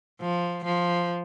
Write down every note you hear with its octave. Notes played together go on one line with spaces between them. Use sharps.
F3
F3